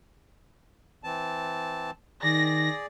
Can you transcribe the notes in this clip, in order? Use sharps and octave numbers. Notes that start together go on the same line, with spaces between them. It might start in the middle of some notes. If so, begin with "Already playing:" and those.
E3 C4 A5
D#3 G#4 D5 A#6